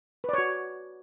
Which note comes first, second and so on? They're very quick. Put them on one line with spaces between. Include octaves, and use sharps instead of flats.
B4 D5 C#5 F#4